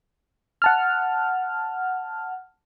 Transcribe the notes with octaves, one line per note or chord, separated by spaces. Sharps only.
F#5 A5 F6